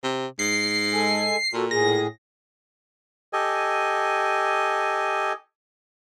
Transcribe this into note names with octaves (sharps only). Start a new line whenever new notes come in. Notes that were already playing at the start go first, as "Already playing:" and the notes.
C3
G#2 C7
G#3 A4 G#5
A#2 F#4 A4
A2 G#4 A#6
G4 A4 D#5 G#5